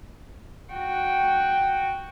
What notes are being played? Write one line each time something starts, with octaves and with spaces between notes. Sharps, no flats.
F#4 G5